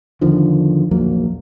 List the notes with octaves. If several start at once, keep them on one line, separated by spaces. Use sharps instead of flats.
E2 D3 D#3 F3
A#1 E2 F#3 A#3